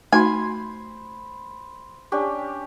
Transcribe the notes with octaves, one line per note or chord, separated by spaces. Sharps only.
A3 D#4 F#4 C5 G#5 B5 C6
C#4 D4 G4